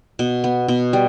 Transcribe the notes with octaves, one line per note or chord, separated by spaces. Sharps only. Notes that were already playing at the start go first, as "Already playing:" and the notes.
B2
B3
B2
G3